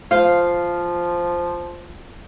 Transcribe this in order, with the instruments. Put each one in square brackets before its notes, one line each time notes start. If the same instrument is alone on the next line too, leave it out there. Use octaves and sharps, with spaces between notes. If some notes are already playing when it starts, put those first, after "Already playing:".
[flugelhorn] F3 [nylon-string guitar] F4 C5 [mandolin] F5